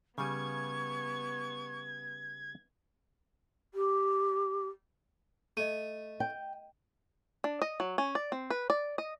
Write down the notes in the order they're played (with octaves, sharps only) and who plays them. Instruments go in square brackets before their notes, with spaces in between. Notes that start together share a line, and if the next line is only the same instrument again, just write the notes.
[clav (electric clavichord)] C#3 G3 G#5 [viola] B3 [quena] C#6 [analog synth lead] G#6
[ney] G4
[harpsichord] A3 [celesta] D#5 D#7
[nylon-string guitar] G5
[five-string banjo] D4
D#5
F#3
C#4
D5
C4
B4
D5
D#5